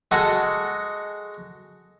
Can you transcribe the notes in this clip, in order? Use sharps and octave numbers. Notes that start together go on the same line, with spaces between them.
G#3 F#4 A4 D#5